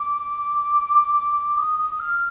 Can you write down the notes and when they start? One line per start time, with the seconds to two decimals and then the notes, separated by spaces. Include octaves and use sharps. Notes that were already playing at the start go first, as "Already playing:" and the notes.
Already playing: D6
1.57 D#6
1.79 D#6
1.99 F6